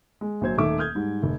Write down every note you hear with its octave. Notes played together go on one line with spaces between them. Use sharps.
G#3
A#1 F#3 C5 G#6
D#1 D#3 A3 E5 D6
D#6 F6 G6 G#6
G#2 G3
F1